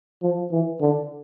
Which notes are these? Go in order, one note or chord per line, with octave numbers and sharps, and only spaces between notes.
F3
E3
D3